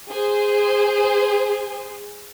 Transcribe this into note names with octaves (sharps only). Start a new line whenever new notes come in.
G#4 C5